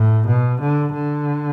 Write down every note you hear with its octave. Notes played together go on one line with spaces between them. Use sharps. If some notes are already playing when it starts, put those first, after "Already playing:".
Already playing: A2
B2
D3
D3